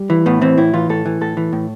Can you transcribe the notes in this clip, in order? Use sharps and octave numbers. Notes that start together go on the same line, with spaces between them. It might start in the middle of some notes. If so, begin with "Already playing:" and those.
Already playing: G3
E3
A2 B3
E3 C4
A2 E4
E3 F4
A2 A4
E3
A2 A4
E3
A2